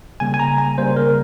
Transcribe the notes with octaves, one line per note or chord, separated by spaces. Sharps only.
C#3 G3 A#3 G#5
G#5
A#5
G#5
C#3 G3 A#3 C5
A#4